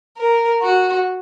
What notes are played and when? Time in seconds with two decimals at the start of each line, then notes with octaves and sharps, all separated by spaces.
0.17 A#4
0.62 F#4